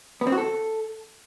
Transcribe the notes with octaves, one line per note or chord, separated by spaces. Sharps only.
B3
C4
F#4
A4